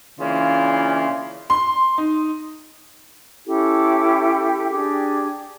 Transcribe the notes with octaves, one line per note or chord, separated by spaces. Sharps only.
C#3 E3 A#3 D4 F4
C6
D#4
C#4 E4 G4 A4
D4 G4 G#4